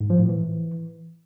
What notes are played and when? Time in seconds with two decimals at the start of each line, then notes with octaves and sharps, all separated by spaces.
0.01 G#2
0.10 F3
0.20 A2
0.29 E3